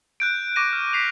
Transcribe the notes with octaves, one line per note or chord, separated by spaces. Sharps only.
F#6 G6 D7
C#6 D6 A#6 D#7
F6
B6 C7 F7